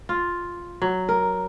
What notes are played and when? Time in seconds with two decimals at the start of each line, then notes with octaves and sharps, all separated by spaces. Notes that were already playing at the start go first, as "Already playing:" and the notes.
0.09 F4
0.82 F#3
1.09 A#4